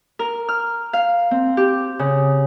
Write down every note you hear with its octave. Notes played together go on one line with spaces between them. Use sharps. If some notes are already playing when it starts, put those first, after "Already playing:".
A#4
F6
F5
C4
G4
C#3